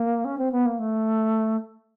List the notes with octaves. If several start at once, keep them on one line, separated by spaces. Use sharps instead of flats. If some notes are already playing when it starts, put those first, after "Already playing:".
Already playing: A#3
C#4
C4
B3
A#3
A3